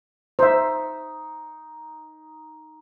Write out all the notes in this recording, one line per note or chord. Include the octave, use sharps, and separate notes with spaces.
D#4 C5 E5